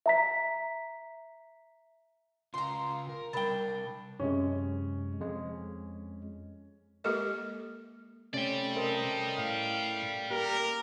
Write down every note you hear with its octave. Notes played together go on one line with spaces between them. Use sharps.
E5 A#5 B6
C#3 F4 A#5 C6
A#4
C3 G3 D4 A#4 G5 B5 A6
F#2 C3 G#3 C#4
F2 G#3
G#3 A#3 G4 A4 A#4 D#5
C3 A3 C#4 D5 G5
A4 A#4 C5 D#5
A2 F5
A#3 G4 A#4